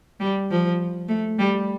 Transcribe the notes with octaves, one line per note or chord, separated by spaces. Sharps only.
G3
F3
A3
G3